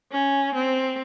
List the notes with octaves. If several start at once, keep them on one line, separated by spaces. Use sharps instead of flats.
C#4
C4